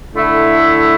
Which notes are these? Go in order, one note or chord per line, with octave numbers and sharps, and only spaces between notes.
D3 A3 E4